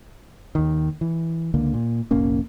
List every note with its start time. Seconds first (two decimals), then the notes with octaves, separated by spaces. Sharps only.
0.55 D#2 D#3
1.01 E3
1.54 C#2 D3 A#3
1.74 A#2
2.11 F1 A#1 A#3 C#4